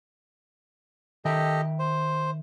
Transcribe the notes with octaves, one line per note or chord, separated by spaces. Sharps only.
D#3 G4 A4 D#5 E5 G5
C5